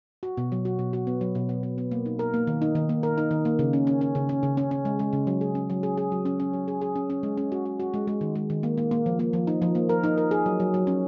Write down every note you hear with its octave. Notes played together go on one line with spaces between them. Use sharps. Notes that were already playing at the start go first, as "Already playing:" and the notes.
F#4
B2
F#3
F#4
B2
F#4
B3
F#3
B2
B3
B3
B3
A#3
D#4
A#4
A#3
D#3
D#4
D#3
A#3
A#4
D#4
D#3
A#3
C#3
C#4
C#4
C#4
C#3
C#4
C#3
C#4
C#4
G#3
G#3
C#3
F#3
G#4
C#4
F#3
G#4
G#4
F#3
C#4
C#4
F#3
G#4
G#4
C#4
C#4
G#3
C#4
F#4
F#4
F#4
G#3
G#3
D#3
G#3
D#3
A#3
A#3
A#3
F3
A#3
F3
D#4
F3
A#3
A#4
D#4
A#4
G#4
F#3
F#3
F#3
C#4